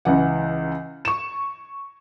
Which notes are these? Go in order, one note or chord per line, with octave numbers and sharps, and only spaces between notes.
C#2 E3 F#5
C#6 E7